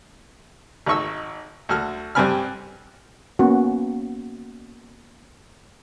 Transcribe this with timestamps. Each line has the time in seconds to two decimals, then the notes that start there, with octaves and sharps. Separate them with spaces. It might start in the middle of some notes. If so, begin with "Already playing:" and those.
0.86 G#1 D#4 C#6 E6
1.69 D2 F#4 A4 F6
2.15 G2 G3 C4 G#5 B5 F6
3.39 A#3 B3 C#4 F#4